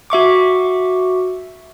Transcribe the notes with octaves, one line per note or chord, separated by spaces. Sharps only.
F#4 E5 C#6 D6